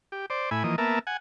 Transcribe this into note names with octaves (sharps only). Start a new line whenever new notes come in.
G4
C5 D5
A2 E4 G#5 B5
E3 F3 A#3 D#5
A#3 B3 A#4 E5 A5
F#5 G#5